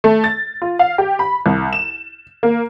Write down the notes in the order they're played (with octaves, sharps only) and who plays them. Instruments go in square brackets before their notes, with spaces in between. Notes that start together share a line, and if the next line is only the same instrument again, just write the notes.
[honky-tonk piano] A3
A6
F4
F5
G4
B5
C2
E7
A#3